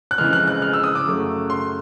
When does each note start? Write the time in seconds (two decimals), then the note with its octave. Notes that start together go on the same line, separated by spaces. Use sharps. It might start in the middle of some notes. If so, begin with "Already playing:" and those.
0.11 F#6
0.18 F2 C#3 E3 G#3 F6
0.33 F#6
0.48 F#6
0.62 F6
0.73 E6
0.84 D#6
0.95 D6
1.06 F#2 C#3 F#3 A3
1.50 C6